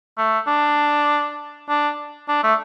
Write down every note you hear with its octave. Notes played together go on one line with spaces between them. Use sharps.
A3
D4
D4
D4
A3